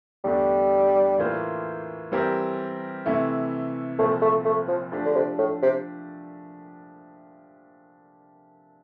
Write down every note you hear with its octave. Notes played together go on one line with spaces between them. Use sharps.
E2 D3 G3 A3 D4 G4
A2 E3 A#3 F4 C5
E3 G3 C4 G4 A#4
C3 E3 A3 E4
C2 A#2 F3 A3 C4
A3
A3
F3
F3 A3 D4 G4
D3
C3
A2
C3